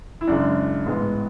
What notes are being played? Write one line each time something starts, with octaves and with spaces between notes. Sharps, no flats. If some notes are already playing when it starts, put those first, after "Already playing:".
E4
F#2 C#3 G#3 D4
A1 G#2 G#3 B3